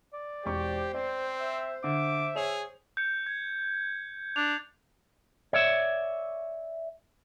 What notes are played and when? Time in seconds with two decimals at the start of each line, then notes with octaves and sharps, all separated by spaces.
0.13 D5
0.46 E1 C4 G4 C5 C#6
0.94 C4 D5
1.39 E5
1.84 D3 E5 D6
2.36 G#4 C#5 F7
2.97 G6 C#7
3.27 G#6
4.36 D4 F7
5.53 C#5 D5 E5